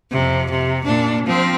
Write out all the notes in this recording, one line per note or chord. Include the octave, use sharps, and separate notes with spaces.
F2 C3
C3
A#2 D4
F3 C4